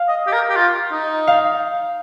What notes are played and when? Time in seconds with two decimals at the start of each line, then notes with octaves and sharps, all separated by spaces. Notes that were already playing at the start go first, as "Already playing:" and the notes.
Already playing: F5
0.08 D#5
0.27 G4
0.32 A#4
0.50 G4
0.56 F4
0.92 D#4
1.27 F5